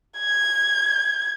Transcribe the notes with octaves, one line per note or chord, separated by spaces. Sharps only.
G#6